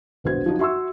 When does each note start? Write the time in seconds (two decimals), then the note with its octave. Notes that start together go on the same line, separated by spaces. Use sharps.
0.24 E1 A#1 B3 F#4 C5 G#6
0.46 F3 F#3 D4 D#4 F#4
0.59 F#4 E5 C6 C#6 E6